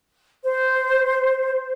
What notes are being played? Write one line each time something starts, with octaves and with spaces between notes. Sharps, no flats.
C5